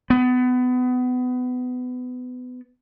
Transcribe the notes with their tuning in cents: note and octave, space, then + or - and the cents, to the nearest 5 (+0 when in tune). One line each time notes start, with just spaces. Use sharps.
B3 +25